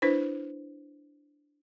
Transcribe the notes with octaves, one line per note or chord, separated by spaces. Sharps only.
D4 E4 B4 C5